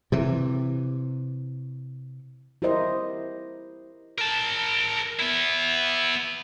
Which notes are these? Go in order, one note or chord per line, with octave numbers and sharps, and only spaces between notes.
C3 E3
E4 G4 A#4 C5 D#5
A#4 A5
B3 E4